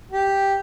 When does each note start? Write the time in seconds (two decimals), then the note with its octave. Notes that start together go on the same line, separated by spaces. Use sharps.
0.12 G4